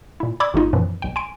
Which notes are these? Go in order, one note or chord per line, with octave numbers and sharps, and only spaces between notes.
A#2 E4
D5 B5 D6 E6 G#6
G#1 A3 D#4 F4
F#2 A#2 E3 F3 B3
B1 G5
G#5 C6 D7